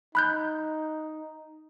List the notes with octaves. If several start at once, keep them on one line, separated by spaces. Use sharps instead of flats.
D#4 B5 F#6 G6